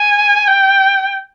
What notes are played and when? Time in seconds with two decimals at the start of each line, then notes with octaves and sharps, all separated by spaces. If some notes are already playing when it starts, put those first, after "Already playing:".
Already playing: G#5
0.48 G5